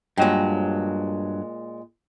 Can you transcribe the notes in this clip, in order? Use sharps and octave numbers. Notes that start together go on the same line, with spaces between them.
G2 A#2 F#3 G#3 C#5 D#5 G5